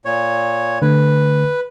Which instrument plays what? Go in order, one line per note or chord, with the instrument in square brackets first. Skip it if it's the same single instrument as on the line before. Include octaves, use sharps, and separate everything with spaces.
[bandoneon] A#2 C#5
[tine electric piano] D3 A3 [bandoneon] B4